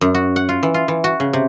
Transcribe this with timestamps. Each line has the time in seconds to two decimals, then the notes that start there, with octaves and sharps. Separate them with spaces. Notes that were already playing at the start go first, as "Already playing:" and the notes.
0.01 F#2
0.15 F#4
0.36 F#5
0.49 F4
0.63 E3
0.74 F4
0.88 E3
1.04 F#4
1.20 C#3
1.33 C3